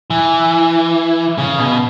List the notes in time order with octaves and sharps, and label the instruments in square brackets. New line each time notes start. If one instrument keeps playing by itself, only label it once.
[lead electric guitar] E3
C#3
B2